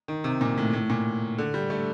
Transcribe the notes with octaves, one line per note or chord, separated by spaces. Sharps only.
D#3
C3
A#2
A2
A2
A#2
D3
G3
A3